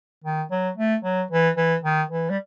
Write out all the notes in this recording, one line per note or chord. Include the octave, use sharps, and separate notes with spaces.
D#3
F#3
A3
F#3
E3
E3
D#3
E3
G3